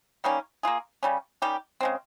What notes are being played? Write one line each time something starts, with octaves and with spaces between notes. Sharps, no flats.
D#3 G3 A#3 C#4
A#3 F4 G#4
C#3 G3 C#4
D#3 G3 C#4 G4
C#3 G#3 C4